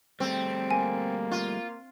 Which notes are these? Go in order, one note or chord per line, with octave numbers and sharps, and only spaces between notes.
G3 A3 C4
A#3 G#5
F4